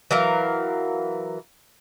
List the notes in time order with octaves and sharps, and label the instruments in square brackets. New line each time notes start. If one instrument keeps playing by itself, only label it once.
[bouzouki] E3 F#3 A#4 F5